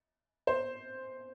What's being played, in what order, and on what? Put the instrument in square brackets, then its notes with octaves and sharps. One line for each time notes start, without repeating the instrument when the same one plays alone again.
[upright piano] C5